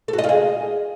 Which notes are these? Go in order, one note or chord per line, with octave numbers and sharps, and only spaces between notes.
A4
F#4
D#5
F4
G#4